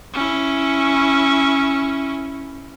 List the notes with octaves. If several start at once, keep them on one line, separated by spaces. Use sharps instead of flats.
C#4 E4